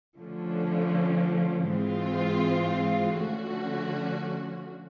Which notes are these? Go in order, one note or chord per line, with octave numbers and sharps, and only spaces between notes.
D3 F3 A3 C#4
G#2 E3 G#3 C4 F4
D3 F3 A3 C#4 F#4